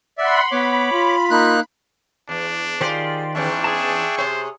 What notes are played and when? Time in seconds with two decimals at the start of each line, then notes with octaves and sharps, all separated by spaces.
0.18 D5 E5 F#5 B5 C6
0.52 B3 C#5 B5 D6
0.92 F4
1.31 A#3 D#4 F#6
2.29 E2 D4
2.81 D#3 F4 G4 G#4 C5 D5
3.35 E2 G#2 C#4 D4 E5 G5 C#6
3.64 G#4 A5
4.18 C3 C5 C#5